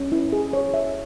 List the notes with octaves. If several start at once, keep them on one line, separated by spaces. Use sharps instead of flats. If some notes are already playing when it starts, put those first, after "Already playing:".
Already playing: C#4
E4
G#4
C#5
E5